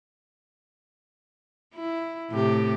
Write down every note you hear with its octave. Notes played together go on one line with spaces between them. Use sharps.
E4
A2 C3 G4